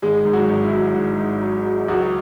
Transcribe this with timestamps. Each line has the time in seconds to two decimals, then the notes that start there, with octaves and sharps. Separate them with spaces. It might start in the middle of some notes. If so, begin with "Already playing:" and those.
0.02 G#1 G#3 G#4
0.25 G#2
0.33 F#3 F#4
0.49 G#1
0.64 E4
0.72 F#3
0.96 G#2
1.19 G#2
1.42 F#3
1.65 F#3
1.88 C#2 F#3 F#4